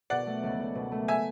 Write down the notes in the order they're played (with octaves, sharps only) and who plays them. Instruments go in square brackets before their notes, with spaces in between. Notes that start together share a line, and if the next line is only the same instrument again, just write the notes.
[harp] B2 [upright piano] D5 F#5
[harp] A3
C#2
C#2
B2
A3
[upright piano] E5 G#5